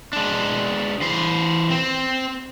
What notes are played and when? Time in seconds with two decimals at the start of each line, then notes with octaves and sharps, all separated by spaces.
0.13 G#3 D4
1.02 E3 C5
1.70 C4